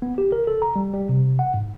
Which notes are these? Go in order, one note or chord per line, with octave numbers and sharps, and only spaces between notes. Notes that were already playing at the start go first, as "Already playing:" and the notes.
B3
G4
A#4
A4
A#5
G3
G3
C3
F#5
G#2